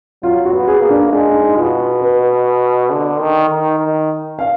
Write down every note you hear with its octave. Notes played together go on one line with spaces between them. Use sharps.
F#3 F4
F#4
B3
G#4
A#3
D4
G#3 D4
D#4
B2 F4
B4
D3
D#3
D#3
D#3
F5